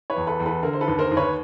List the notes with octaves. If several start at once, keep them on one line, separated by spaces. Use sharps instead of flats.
B4 C#5
E2
A4 B4
E2
A4 B4
D3 A#4
C5
A4 B4
D#2
A#4 C5
D#2
B4 C#5